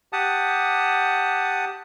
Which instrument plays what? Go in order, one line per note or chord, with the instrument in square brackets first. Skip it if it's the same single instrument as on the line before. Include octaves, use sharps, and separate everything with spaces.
[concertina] G4 F#5 A5 D#6